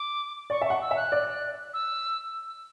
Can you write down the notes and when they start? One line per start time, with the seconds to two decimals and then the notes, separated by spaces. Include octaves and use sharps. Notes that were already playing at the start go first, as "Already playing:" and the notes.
Already playing: D6
0.50 D5 C#6
0.62 E5
0.66 F#5 C#6
0.81 E6
0.91 E5
0.96 F#6
1.12 D5
1.73 E6